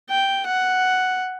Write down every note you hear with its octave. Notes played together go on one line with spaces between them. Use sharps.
G5
F#5